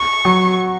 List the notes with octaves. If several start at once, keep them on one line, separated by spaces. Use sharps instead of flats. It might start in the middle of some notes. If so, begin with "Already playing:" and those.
Already playing: C#6
F#3